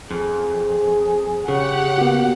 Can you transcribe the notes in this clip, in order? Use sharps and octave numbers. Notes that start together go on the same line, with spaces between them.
F2 G#4
C#3 C#4 G4 G#4 F#5
A#3 B3 F#4